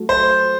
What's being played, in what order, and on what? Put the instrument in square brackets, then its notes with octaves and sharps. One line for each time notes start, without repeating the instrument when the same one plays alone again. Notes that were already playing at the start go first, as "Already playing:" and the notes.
Already playing: [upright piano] F#3 A3
[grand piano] C5